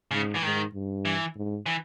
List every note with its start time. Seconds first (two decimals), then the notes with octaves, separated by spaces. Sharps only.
0.11 G#2 C#3
0.35 E3
0.42 G#2 D#3
0.74 G2
1.05 E3
1.36 G#2
1.66 E3